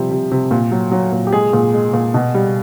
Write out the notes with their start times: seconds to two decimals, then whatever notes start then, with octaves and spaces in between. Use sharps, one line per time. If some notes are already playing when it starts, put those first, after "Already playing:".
Already playing: C3 F3 G3
0.11 C3
0.31 C3
0.51 A#2
0.72 F#3
0.92 F#3
1.12 A#2
1.27 G4
1.33 G#3 G#4
1.53 A#2
1.74 G#3
1.94 A#2
2.14 B2
2.34 G3